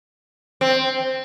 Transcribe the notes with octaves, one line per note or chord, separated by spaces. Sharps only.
C4